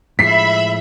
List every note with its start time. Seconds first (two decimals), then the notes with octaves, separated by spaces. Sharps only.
0.19 A2 F3 G#3 E5 B5 B6 C7